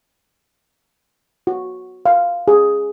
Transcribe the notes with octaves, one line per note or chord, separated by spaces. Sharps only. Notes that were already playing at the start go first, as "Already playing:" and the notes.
F#4
F5
G#4